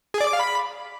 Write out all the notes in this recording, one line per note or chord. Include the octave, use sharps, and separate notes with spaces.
G#4
D5
D6
F5
B5